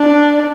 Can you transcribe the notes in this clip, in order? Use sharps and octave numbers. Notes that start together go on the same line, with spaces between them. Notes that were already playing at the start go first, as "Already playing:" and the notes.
Already playing: D4